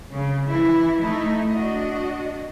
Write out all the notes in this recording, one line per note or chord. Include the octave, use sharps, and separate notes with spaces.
C#3
E3 E4
A3 D#4 E4
D4 F#4 D#5